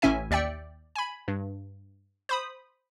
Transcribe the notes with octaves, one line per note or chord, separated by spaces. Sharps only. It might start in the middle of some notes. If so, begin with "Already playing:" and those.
A1 A2 C#4 E5 G#5
D#2 D5 E5 G5 C#7
G#5 B5
G2
C5 B5 D#6